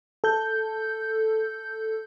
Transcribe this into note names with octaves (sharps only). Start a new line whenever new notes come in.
A4 G6